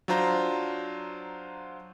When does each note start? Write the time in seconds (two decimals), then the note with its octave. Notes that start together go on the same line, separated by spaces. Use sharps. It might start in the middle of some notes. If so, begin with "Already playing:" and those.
0.08 F#3 D4 F4 C5 A#5